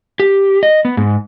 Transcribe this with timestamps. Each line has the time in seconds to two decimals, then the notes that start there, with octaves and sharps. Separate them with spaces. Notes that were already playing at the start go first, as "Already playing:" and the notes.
0.20 G4
0.63 D#5
0.85 B3
0.97 G#2